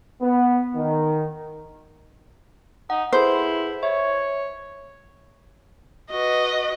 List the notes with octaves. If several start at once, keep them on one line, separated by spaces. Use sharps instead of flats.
B3
D#3
D#4 F#5
E4 G#4 A4 B4 C5
C#5 E5 C#6
F#4 B4 D#5